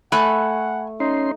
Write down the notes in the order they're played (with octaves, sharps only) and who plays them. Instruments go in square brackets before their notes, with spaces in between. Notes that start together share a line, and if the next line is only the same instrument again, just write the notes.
[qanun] A3 [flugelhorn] F#5 [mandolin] G#5 B5 F#6
[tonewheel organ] C#4 C6 [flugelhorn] D#4